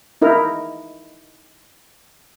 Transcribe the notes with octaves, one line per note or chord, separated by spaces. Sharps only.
D#4 E4 A#4